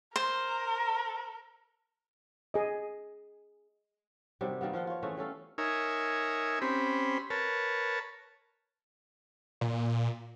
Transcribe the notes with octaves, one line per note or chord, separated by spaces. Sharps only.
A#4 C5
G#4 D#5
C3 D#3 F#3 G3
D#3 G3 A#3 B3
F3 F4 F#5 G5
F4 C#5
E3 A3 C#4 G#4
G3 C#4 A4 F5
D#4 A#4 C#5 E5 G#5
C4 C#4 G4 C5 B5
A#4 B4 C#5 A5
A#2